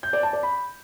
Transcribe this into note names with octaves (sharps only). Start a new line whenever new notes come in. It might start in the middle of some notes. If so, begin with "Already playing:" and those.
G6
D5
A5
D5
B5